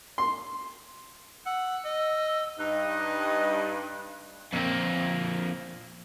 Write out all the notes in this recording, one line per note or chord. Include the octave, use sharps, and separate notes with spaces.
C6
F#5 E6
D#5
G2 D#4 D#5 F#6
F2 A#2 A#3 C4